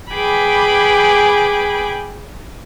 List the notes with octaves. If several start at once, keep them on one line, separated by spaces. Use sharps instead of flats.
G#4 B4 G5 G#5 B5 D6